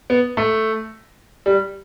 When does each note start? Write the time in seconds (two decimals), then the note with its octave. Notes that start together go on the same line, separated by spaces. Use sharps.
0.10 B3
0.37 A3
1.46 G3